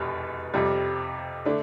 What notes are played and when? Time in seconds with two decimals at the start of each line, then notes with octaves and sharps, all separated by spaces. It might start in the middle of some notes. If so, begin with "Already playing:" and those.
Already playing: F1 E2 B2 G3
0.54 F2 C3 G3
1.45 D3 A3 D4